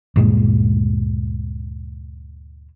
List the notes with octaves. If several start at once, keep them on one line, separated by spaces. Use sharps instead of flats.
D2 G2 A#2 G#3